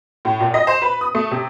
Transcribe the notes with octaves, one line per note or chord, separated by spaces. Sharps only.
A2
A#2
D#5
C5
B4
D#6
A3
C3